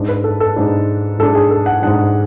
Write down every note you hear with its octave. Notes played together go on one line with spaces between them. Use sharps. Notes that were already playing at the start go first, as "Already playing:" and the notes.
Already playing: G#2 G#3 D4
B4
A4
A4
G#2 G#3 D4
G#2 G#3 D4 A4
G#4
A4
F#5
G#2 G#3 D4 F#5